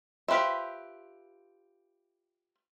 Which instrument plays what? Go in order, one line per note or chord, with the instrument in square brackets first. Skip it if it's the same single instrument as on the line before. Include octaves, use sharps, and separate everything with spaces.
[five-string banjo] F4 G4 B4 C5 E5